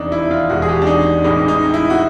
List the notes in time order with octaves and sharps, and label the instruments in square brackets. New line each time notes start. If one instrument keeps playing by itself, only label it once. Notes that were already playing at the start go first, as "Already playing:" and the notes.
Already playing: [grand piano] F1 E2 C3 D#3 D4 D#4
E4
F4
E1 E2 B2 G#3 F#4
G#4
G4
D4
D#4
A1 A2 E3 G#3 D#4
D#4
E4
F#4